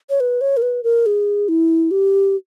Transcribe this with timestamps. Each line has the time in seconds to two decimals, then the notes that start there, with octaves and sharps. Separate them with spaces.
0.10 C#5
0.20 B4
0.41 C#5
0.57 A#4
0.62 B4
0.83 A#4
1.06 G#4
1.49 E4
1.91 G4